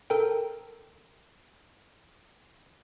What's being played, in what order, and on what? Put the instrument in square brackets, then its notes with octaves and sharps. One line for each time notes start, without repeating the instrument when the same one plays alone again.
[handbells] A4 A#4 G5